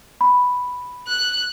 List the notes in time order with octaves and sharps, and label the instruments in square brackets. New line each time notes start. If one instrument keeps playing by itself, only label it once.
[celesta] B5
[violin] F#6